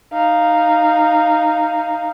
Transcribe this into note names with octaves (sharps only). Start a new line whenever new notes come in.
D#4 F5